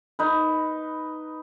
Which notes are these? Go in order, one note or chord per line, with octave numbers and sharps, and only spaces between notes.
D#4 B4